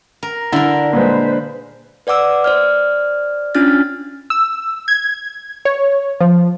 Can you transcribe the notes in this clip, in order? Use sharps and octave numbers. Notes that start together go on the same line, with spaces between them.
A#4
D3 D4 E4 A#4
A#2 G#3 B4 C5
B4 D5 F#5 D6 E6
C5 D5 F6
C#4 D4 F4 F6 A6
E6
G#6
C#5
F3